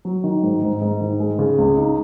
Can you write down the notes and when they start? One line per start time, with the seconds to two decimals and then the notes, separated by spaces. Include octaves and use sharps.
0.05 F#3
0.24 D#3
0.43 G#2
0.62 G#2
0.82 G#2
1.01 D#3
1.20 G#3
1.39 C#3
1.58 C#2
1.77 D#4